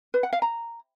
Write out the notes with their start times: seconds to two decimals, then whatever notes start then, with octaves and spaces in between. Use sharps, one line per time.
0.14 B4
0.23 F#5
0.33 F5
0.42 A#5